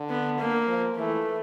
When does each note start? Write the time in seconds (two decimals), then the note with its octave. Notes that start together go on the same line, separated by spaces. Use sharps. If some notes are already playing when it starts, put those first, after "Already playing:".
Already playing: D3
0.09 B3
0.39 A#3
0.67 F3
0.96 E3 A3